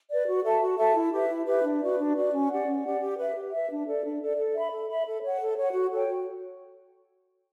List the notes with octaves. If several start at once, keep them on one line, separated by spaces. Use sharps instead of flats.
B4 D5
F#4
A4 E5 A5
F#4
A4 E5 A5
E4
G4 B4 E5
E4
G4 B4 E5
D4
F#4 B4 D5
D4
F#4 B4 D5
C#4
G4 D5 F#5
C#4
G4 D5 F#5
G4
B4 E5
G4
B4 E5
D4
A4 D5
D4
A4 D5
A4
E5 B5
A4
E5 B5
A4
C#5 F#5
A4
C#5 F#5
F#4
A4 C#5 G5
F#4